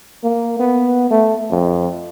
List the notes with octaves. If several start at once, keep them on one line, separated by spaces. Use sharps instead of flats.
A#3
B3
A3
F2